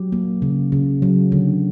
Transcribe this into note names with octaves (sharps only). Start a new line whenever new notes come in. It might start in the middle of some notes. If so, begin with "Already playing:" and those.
Already playing: F#3 G4
A#3
C#3
C#3
F#3
D3